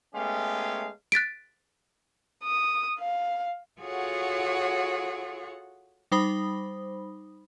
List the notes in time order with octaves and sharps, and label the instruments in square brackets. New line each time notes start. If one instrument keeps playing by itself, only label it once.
[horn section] G#3 A3 B3 C#4 G4 F5
[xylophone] F#6 A6 B6 D7
[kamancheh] D#6
F5
[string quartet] F4 F#4 G#4 A4 C#5 F#5
[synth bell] G3 D#4 C5 B5 D#6